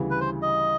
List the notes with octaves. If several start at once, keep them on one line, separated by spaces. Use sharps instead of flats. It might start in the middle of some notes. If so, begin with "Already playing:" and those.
Already playing: D2 C#3 E3 G3
B4
C5
D#5